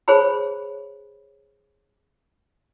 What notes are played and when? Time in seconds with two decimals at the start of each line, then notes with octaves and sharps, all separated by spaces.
0.08 G#4 C5 C#5 A5 B5